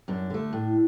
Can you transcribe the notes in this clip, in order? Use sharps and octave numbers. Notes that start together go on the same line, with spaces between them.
F#2 D4
D3 A3
A2